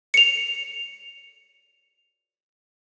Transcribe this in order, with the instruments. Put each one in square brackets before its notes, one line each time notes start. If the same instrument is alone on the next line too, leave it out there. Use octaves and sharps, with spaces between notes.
[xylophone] C#7 F7